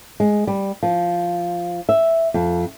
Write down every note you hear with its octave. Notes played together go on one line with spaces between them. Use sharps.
G#3
G3
F3
E5
F2